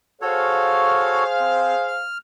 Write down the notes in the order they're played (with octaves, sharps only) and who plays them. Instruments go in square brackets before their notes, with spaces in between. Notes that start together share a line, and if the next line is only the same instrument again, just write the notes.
[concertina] F#4 A4 C#5 [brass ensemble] G#4 C5 F5
[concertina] C4
F6